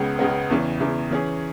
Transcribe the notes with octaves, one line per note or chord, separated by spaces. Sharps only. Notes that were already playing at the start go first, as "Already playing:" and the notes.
Already playing: C#2 C#3 G#3 B3
C#2 C#3 G#3 B3
E2 C#3 E3
E2 C#3 E3
E3 C#4 G#4